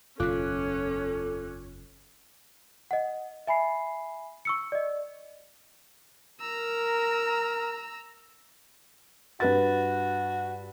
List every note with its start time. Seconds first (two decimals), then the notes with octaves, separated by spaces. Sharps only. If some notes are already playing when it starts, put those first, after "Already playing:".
0.20 F#1 E2 B2 C#4 F4 A4 D6 F#6
2.91 D#5 F#5
3.47 E5 G#5 B5 C7
4.45 C#6 E6 C#7
4.72 D5 D#5
6.40 A#4 A#5 E6
9.40 G2 F#4 B4 A6